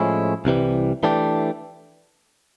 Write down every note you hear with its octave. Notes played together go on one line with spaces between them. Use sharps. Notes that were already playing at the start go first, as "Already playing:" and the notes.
Already playing: A2 F3 G#3 C#4 E4
C2 C3 E3 G3
E3 A3 D4 G4